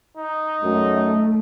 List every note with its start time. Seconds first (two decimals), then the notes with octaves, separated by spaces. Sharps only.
0.17 D#4
0.64 F#2 A3